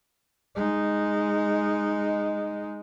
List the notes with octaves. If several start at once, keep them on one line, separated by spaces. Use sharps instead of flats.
G#3 D#4